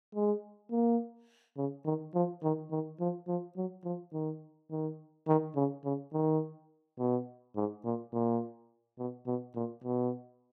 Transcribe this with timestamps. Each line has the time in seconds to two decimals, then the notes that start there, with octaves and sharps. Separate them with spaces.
0.15 G#3
0.71 A#3
1.57 C#3
1.85 D#3
2.14 F3
2.43 D#3
2.71 D#3
3.00 F3
3.27 F3
3.56 F#3
3.84 F3
4.13 D#3
4.71 D#3
5.27 D#3
5.56 C#3
5.84 C#3
6.13 D#3
6.99 B2
7.56 G#2
7.84 A#2
8.13 A#2
8.98 B2
9.26 B2
9.55 A#2
9.84 B2